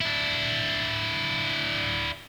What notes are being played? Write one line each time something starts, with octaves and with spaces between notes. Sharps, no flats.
D4 E4